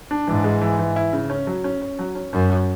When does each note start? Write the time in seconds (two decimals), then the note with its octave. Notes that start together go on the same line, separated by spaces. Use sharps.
0.11 D4
0.28 G#2 E3
0.44 G#3
0.62 E3
0.79 E3
0.96 E4
1.13 C#3
1.30 C#4
1.47 F#3
1.64 C#4
1.82 C#4
1.99 F#3
2.15 C#4
2.33 F#2 C#4
2.50 F#3